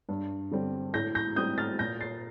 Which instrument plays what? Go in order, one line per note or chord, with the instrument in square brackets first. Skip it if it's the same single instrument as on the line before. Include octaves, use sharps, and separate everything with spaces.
[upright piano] G2
D3 G3 C4
A2 G6 A#6
G6 A#6
G3 C4 D#6 G6
F6 A6
A#2 G6 A#6
A6 C7